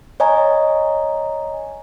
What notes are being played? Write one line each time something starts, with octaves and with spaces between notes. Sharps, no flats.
C#5 D#5 G#5 A#5